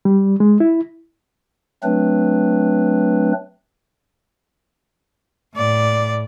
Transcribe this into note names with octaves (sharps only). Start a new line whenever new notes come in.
G3
G#3
E4
F#3 A3 C4 D4 B4
A2 D5